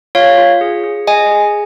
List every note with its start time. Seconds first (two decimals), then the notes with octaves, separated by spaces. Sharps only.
0.15 F4 C#5 F5
0.38 F4
0.61 G#4
0.84 G#4
1.07 G#4 D#5 G#5
1.31 G#4